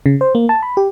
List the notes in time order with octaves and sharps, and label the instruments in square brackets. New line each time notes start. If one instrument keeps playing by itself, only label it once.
[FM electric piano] C#3
C5
A#3
A5
B5
G4